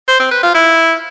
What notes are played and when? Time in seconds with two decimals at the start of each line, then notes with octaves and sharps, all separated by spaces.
0.08 C5
0.20 C4
0.31 B4
0.43 F4
0.55 E4